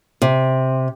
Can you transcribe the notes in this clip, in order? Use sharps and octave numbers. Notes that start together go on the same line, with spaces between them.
C3